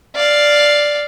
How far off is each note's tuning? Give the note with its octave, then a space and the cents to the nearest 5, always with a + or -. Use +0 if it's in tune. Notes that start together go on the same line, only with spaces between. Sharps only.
D5 +0 F5 +0